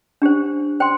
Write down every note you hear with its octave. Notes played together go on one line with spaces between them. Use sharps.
D4 G4 C5
C5 G5 C6